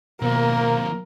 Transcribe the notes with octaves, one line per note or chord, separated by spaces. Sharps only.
D#2 B2 A#3 C4 A#4